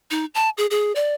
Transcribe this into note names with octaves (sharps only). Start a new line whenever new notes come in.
D#4
A5
G#4
G#4
D5